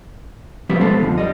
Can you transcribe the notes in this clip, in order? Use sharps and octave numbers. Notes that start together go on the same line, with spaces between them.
F3 G3 B3 C#4 G4 E5
G#3 B3 A4 C5
F2 B2 D3 F3
G3 D#5